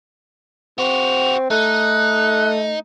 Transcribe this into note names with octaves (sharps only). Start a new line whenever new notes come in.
C4 F#4 G4 F7
A3 D#4 F#6